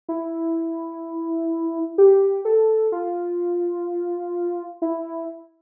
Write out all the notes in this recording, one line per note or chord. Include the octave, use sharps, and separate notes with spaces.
E4
G4
A4
F4
E4